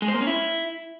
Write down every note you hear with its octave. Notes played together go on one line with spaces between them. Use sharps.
G#3
C5
A#3
C#4
E4